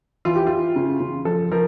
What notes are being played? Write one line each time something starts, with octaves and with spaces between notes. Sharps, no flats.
E3 F4
G4
E3 F4
C#3
C#3
F3 A4
F3 A#4